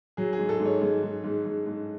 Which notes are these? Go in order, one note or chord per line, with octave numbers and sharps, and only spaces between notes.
F#3 G#4
G#4
G#2
A4
G#2
C#5
G#2
G#2
G#2
G#2
G#2